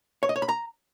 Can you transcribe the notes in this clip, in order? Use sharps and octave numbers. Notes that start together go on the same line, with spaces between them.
C#5
D#5
C#5
B5
A#5